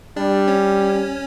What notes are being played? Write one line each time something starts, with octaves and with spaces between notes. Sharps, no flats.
G3 D4 D5
C#4 C#5